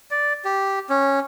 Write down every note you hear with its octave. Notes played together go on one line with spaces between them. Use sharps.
D5
G4
C#4